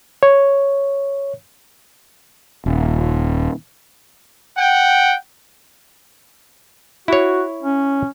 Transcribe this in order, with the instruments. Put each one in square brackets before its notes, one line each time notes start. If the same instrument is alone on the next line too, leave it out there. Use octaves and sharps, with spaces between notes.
[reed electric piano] C#5
[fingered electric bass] D#1
[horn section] F#5 G5
[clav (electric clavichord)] E4 C#5 [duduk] F#4
[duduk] C#4